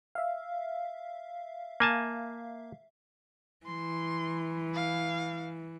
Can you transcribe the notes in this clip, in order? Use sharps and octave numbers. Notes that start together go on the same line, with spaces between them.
E5 F5
A#3 G#5 A5
E3 C6
F5